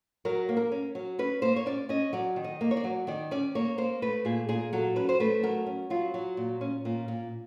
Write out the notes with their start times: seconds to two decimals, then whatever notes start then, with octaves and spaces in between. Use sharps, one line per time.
0.25 F#3 A#4
0.49 A#3
0.57 A#4
0.72 C#4
0.95 F#3
1.19 C#4 B4
1.42 A#3 C5
1.56 C#5
1.66 C#4 D5
1.89 C#4 D#5
2.13 F#3 D5
2.36 D#3
2.44 D#5
2.61 A#3
2.71 C#5
2.77 D5
2.84 F#3
3.07 D#3 D5
3.31 C#4 D5
3.55 A#3 C#5
3.78 A#3 C5
4.02 A3 B4
4.25 A#2 G#4
4.49 A#2 G#4
4.73 F#3 A4
4.96 C#4 B4
5.09 C5
5.20 A3 B4
5.43 F#3 A#4
5.67 C#4
5.90 F#3 F4
6.14 F#3
6.37 A#2
6.61 C#4
6.85 A#2
7.08 A#2